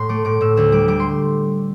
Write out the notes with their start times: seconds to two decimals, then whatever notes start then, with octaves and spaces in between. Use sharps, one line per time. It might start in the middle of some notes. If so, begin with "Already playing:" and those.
Already playing: A2 C6
0.09 A3 D6
0.25 A2 D6
0.41 A2 E6
0.56 D2 E6
0.72 G3 D6
0.88 G3 D6
1.00 C6